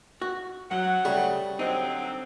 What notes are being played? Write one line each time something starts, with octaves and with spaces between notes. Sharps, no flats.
F#4
F#2 F#3 F#5
C#3 G3 A3
D3 F#3 C4 D#4